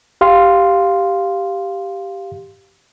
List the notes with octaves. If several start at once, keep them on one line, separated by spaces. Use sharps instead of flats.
G4 F5 C6